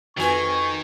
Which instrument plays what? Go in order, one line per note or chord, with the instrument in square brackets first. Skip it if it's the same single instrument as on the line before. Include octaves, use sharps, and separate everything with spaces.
[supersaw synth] F2 G#5 G#6 [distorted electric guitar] D#3 [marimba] F#4 B4 [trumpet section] C#6